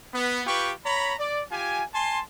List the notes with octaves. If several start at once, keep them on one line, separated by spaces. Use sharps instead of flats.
B3
F4 G4 B4 G5 C#6
C#5 A#5 B5
D5
F4 G4 G#5
G#5 A5 C6